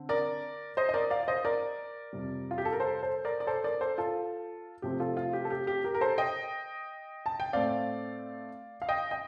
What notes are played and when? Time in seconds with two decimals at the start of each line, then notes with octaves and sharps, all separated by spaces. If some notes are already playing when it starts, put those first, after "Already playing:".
Already playing: D3 C4
0.09 A#4 D5
0.77 C5 D#5
0.89 D#5
0.94 A#4 D5
1.11 D5 F5
1.23 D5
1.28 C5 D#5
1.45 A#4 D5
2.13 F2 C3 G3
2.51 F4
2.58 G4
2.65 A4
2.72 A#4
2.80 A4 C5
3.03 A4 C5
3.25 A#4 D5
3.40 D5
3.47 A4 C5
3.64 A#4 D5
3.81 A4 C5
3.98 F4 A4
4.82 C3 F3 A3 C4 G4
5.00 F4 A4
5.17 F4
5.33 G4
5.45 A4
5.50 G4
5.67 G4
5.84 G4 A#4
5.95 A#4
6.01 A4 C5
6.18 D#5 G5
7.26 A5
7.40 G5
7.53 A2 A3 C4 D5 F5
8.82 F5
8.89 D#5 G5
9.11 D#5 G5